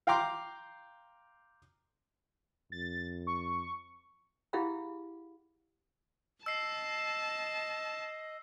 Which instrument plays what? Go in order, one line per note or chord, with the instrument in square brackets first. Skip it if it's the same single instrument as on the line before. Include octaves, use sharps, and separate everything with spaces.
[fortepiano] F5 G5 A#5 C6 D6
[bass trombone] F2 [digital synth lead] A6
[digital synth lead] C#6
[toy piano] E4 G4 G#4 F5 F#5 B5
[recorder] D#5 [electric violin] A5 [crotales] E6 C7